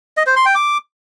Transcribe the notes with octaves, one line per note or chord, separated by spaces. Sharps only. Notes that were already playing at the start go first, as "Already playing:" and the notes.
D#5
C5
C6
G5
D6